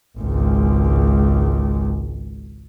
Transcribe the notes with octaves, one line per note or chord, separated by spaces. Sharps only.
G#1 C#2